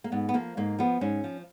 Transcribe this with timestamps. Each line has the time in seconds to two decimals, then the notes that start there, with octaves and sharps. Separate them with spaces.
0.04 A#3
0.12 G#2 B3
0.29 B3
0.34 F3 A#3
0.57 G#2 A#3
0.79 F3 B3
1.01 G#2 C#4
1.24 F3